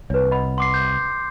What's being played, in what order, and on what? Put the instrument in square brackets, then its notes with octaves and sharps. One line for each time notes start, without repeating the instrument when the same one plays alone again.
[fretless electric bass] C2 [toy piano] B4 C#5
[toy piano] D#5 F#5 B5
[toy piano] F#5 [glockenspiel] C6 D6 C7
[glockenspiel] G6